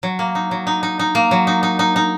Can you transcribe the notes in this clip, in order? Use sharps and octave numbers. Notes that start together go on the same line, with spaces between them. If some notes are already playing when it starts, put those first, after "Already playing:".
F#3
A#3
D#4
F#3
D#4
D#4
D#4
A#3
F#3
D#4
D#4
D#4
D#4